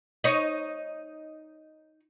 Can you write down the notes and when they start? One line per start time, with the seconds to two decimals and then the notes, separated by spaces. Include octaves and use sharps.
0.24 D#4 C#5